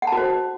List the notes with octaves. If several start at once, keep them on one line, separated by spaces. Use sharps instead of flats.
F#5
A5
F#4
C5